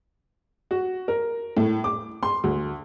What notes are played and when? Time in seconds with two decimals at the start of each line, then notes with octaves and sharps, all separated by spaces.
0.71 F#4
1.08 A#4
1.57 A2
1.84 D6
2.23 C6
2.44 D2